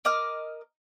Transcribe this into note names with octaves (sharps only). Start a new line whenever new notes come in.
A#4 D#5 D6 F6